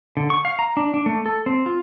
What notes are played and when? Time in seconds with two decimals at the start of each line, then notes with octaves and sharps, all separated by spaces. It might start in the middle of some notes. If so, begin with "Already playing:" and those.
0.17 D3
0.30 C#6
0.45 F5
0.59 A#5
0.77 D4
0.94 D4
1.06 A3
1.26 A4
1.46 C4
1.66 F4